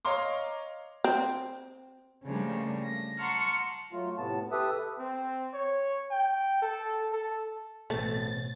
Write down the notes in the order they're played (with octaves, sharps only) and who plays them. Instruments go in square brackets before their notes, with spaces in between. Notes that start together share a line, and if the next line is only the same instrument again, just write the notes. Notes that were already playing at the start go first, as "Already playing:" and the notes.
[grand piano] C#5 D#5 F5 A#5 C6 D6
[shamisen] C4
[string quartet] C#3 F3 G3 A3 A#3 D4
A#6
F#5 A5 A#5 C6 C#6 F6
[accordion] F#3 A3 F4
A2 C3 B3 A5
G4 A4 B4 E5 D#6
[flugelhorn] C4
C#5
G5
A4
A4
[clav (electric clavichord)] A1 C4 A#5 [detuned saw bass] B2 [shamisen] A3 [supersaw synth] A6